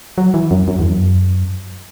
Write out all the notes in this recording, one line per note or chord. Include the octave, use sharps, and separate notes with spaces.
F#3
E3
F#2
F#2
E2
F#2